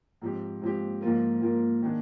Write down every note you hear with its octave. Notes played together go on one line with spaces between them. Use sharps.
G#2 F3 C4 G4
G#2 F3 C4 G4
G#2 F3 A#3 F4 A#4
G#2 F3 A#3 F4 A#4
D#3 A#3 D4 G#4